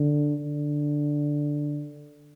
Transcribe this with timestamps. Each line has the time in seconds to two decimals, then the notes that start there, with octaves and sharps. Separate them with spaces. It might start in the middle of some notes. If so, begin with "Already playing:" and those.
Already playing: D3
0.40 D3